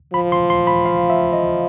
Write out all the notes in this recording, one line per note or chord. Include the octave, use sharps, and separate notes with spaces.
F3 B5
C6
C6
B5
F5
E5
D#5